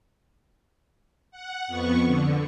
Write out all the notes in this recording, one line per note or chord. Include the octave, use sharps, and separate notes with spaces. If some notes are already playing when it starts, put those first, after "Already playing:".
F#5
F2 B3 C#6
D3